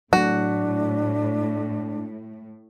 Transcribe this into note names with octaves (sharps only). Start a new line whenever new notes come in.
A2 F#3 A3 D4 F#4